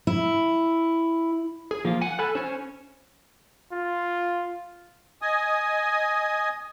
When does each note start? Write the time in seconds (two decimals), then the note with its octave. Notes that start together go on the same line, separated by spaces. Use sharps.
0.07 E4
1.71 G#4
1.85 F3 A#3 F4
2.01 F#5 G#5
2.19 A4 G#5 B5 F#6
2.35 C#4 C5 G#5
3.73 F4
5.22 D#5 G#5 D#6